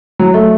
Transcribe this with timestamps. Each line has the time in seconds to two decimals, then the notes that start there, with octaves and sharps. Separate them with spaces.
0.19 F#3
0.34 A3